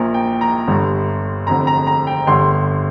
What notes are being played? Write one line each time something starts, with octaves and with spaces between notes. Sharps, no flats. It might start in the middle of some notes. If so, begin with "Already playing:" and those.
Already playing: A#1 A#2 A#5
G5
A#5
G1 G2 D3
F1 F2 D3 A#5
A#5
A#5
G5
G1 G2 D3 C6